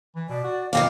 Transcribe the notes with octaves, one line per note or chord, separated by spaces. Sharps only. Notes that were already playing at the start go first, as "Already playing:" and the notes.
E3
B2 D5
F#4
F2 C3 D#3 F5 D6